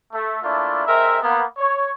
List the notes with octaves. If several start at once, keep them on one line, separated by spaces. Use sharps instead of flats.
A3
A3 A#3 D4 E4 F4
G#3 C4 A#4 E5
A#3 B3
C#5